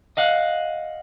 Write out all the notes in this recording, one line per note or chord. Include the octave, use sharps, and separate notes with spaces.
D#5 F5 F#5